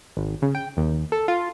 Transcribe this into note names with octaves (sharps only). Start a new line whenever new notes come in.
G#1
C#3
G5
D#2
A4
F4